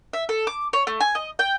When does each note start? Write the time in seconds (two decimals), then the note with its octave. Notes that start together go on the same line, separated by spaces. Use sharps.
0.13 E5
0.29 A4
0.47 D6
0.73 C#5
0.87 A3
1.00 G#5
1.15 D#5
1.39 G5